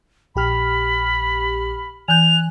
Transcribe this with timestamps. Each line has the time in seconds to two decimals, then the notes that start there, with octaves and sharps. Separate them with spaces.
0.35 A#1 G4 B5 F6
2.08 E3 G#5 F#6 G6 F7